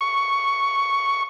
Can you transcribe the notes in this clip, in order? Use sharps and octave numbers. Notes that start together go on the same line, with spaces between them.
C#6